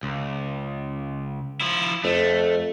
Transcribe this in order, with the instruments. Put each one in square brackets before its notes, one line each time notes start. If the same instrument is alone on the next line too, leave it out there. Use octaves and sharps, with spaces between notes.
[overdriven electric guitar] C#2
F3 E4
[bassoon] F2 [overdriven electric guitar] A3